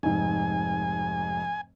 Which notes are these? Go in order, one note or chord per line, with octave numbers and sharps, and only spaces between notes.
F1 G#2 G#5